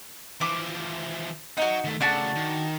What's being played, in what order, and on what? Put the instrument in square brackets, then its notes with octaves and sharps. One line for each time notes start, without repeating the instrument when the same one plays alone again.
[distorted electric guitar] E3 F3 [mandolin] D6
[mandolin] D#4 F#4 [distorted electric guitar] F#5 A#5
[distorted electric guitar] D#3 A3
[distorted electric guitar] C#3 A3 [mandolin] D4 F#4 A5
[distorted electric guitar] D#3